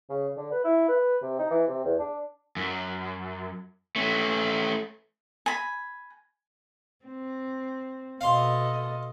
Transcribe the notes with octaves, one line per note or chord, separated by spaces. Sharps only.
C#3
D3
B4
E4
B4
C3
D#4
E3
C3
E2
D4
F#2
A3 C#4
G#5 B5
C4
B2 A4 D#5 F5 C6